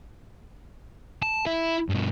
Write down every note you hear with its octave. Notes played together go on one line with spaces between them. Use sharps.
A5
E4
G2 B2